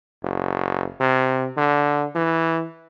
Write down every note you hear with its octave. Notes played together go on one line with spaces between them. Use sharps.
F#1
C3
D3
E3